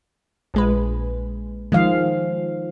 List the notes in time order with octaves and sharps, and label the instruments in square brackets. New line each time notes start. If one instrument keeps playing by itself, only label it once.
[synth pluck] A#1 G#3 B4
[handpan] D#3 F3 F5 [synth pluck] G#3